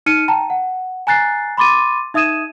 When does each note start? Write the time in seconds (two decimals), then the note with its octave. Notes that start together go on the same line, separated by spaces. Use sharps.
0.06 D#4 F6 C#7 D#7
0.28 G5 A5 A#5
0.50 F#5
1.07 G#5 A#5 F#6 A6 C7
1.57 B5 C6 D6 A6 D#7
2.14 D#4 E5 D#6 G#6 D#7 E7